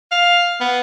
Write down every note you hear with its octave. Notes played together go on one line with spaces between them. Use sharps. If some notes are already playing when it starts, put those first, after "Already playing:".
F5
B3